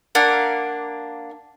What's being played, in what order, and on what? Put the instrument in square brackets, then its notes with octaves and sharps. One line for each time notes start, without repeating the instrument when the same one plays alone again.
[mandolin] A#3 D4 F5 F#5